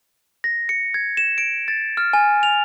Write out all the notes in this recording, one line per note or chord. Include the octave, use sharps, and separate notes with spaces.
A#6
C#7
G#6
E7
D7
A6
F6
G#5
F7